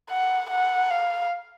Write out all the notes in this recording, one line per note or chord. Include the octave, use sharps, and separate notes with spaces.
F#5
F#5
F5